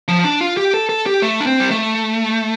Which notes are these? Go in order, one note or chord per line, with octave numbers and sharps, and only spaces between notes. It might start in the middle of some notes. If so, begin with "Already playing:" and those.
F3
D4
F4
G4
A4
A4
G4
A3
D4
C4
G3
A3